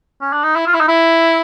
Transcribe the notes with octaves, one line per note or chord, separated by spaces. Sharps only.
C#4
D4
D#4
E4
F4
E4
D#4
E4